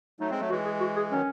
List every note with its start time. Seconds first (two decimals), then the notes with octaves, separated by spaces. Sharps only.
0.20 F#3 A3 D#4
0.30 G#3 C4
0.40 F#3 A3
0.50 E3 G#3 F#4
0.65 G#4
0.80 F#4
0.96 G#4
1.11 D#3 F#3 C#4